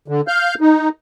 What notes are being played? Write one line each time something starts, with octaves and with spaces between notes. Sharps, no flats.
D3
F5 F6 G6
D#4